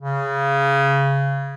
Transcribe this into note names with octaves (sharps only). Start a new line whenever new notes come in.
C#3